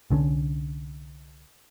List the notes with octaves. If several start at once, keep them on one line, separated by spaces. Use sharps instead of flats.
C2 D3 G#3 C#4